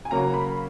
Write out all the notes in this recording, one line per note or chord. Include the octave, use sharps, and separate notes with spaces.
G#5
C#3 F#3 A#3 C#4 A#5
B5